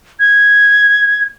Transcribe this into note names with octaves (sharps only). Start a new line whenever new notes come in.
G#6